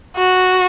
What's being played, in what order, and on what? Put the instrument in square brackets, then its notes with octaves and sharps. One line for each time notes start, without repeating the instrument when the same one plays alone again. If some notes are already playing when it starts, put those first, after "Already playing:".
[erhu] F#4